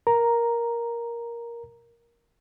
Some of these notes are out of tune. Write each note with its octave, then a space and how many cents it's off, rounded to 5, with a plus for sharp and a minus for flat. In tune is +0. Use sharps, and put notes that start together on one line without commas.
A#4 +10 A#5 +0